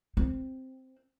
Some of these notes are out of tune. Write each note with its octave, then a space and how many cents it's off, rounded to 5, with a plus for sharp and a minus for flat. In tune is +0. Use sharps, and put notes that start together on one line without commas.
C4 +0